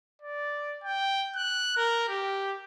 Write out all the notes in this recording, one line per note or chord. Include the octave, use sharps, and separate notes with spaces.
D5
G5
F#6
A#4
G4